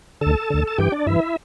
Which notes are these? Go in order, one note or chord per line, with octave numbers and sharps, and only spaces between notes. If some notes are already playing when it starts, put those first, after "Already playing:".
D2 D3 A4 A5
D2 D3
A5
G2 E3 G4 G5
D4 D5
G2 E3 E4 E5